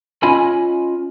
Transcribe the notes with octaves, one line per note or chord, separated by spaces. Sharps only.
C#4 F4 D#5 G#5 B5